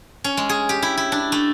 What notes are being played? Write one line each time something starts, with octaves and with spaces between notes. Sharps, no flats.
C#4
G#3
G#4
G4
E4
E4
D4
A3